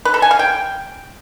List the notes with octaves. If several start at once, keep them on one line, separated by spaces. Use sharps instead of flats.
B4
A4
G#5
F5
G5